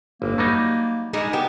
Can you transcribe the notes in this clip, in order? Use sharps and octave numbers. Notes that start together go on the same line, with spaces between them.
G1 A#3
F#3 G3 D#4
G3 G#3 D#4
B3 G4